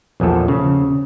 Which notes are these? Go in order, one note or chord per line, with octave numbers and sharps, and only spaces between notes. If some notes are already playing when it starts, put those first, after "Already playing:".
A#1 E2 F3 A4
C#3